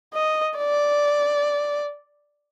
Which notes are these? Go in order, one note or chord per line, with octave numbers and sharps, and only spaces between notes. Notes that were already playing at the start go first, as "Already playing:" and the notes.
D#5
D5